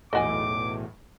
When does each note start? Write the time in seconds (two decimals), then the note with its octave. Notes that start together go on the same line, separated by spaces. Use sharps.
0.13 B1 E2 A2 A3 F#4 D#5 G#5 D6